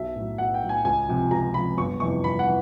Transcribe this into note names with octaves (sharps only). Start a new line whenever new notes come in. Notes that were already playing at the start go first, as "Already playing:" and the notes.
Already playing: B1 E5
A2 F#3
B1 F#5
G5
A2 F#3
G#5
C#2 G#5
C3 F3
C#2 A#5
C3 F3 B5
G1 C#6
F2 C3 E3 C#6
G1 B5
F#5
E3